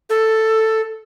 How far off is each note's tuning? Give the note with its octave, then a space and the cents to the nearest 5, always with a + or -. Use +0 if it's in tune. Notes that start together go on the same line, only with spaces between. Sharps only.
A4 +5